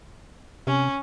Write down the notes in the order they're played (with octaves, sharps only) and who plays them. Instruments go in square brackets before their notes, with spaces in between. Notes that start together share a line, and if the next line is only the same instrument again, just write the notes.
[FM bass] C3 [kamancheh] C#4